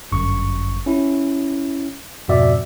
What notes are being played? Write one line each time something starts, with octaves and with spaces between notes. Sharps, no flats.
G1 F#2 C#6
C#4 E4
F2 G#2 B2 F#4 D5 E5